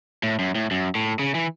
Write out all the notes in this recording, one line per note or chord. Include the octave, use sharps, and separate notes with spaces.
A2
F#2
A2
F#2
A2
C#3
E3